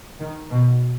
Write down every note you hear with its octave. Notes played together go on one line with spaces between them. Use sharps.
D#3
B2